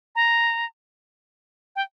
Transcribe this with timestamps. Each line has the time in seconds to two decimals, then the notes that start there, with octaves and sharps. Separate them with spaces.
0.15 A#5
1.76 G5